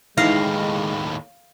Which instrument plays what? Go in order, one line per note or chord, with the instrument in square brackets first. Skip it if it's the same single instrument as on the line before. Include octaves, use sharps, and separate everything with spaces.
[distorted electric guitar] D#2 A2 [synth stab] E3 D#4 A#6 [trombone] G#3 [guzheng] F5